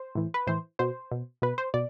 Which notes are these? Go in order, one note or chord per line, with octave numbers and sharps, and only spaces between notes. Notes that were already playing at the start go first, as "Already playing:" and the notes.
Already playing: C5
A2 E3
B4
A2 E3 C5
B2 C5
B2
B2 B4
C5
B2 D5